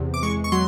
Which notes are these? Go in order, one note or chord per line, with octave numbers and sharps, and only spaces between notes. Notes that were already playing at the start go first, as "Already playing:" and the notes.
Already playing: E2 C3
D6
G#3 C#6
C#6
F#3 C6